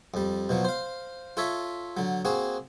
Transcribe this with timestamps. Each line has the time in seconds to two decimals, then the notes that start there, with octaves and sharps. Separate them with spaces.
0.14 F2 G3
0.49 B2 F3 F#3
0.64 C5 F5
1.37 F4 A4 C#5 E5
1.97 D3 F#3
2.25 A#3 C4 F#4 G#4